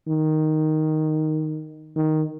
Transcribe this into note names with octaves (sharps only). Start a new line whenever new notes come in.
D#3
D#3